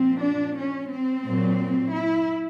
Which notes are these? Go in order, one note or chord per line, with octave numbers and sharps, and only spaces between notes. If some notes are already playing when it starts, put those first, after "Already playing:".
Already playing: A#2 F3 C4
D4
C#4
C4
A#2 F#3
E4